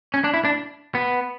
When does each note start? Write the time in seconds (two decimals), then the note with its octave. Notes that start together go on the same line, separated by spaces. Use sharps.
0.14 C#4
0.24 D4
0.34 E4
0.45 D4
0.95 B3